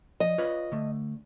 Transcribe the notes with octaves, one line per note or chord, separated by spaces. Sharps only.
F3 D#5
F4 B4 C#5
D3 A3